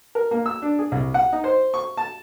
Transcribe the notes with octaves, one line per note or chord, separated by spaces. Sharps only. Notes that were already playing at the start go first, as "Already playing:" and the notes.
A#4
A#3
E6
D4
G#4
C2
F#5
D#4
C5
C#6
A5